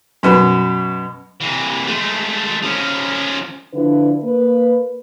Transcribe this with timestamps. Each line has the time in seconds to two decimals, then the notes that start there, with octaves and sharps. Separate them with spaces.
0.23 F#2 B2
1.41 C3 E3
1.87 G#3 A3
2.63 F3 C#4
3.73 D3 F3 D4 E4 F4 B4
4.23 A#3 B4